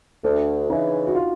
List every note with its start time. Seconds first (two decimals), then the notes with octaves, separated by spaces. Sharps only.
0.24 D2 D4
0.70 C#3 E3 D#4
1.07 F#4
1.15 F4